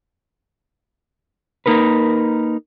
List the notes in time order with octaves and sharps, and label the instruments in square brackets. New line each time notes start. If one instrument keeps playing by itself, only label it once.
[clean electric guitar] A#3 D#4 A#4 B4